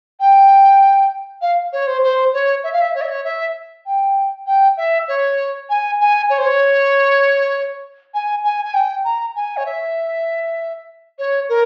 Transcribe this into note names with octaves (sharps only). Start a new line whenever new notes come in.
G5
F5
C#5
C5
C5
C#5
E5
F5
E5
C#5
E5
C#5
E5
G5
G5
E5
C#5
G#5
G#5
C#5
C5
C#5
G#5
G#5
G#5
G5
A#5
G#5
C#5
E5
C#5
A#4